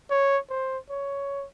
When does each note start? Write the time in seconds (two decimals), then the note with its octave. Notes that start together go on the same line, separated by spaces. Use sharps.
0.10 C#5
0.50 C5
0.90 C#5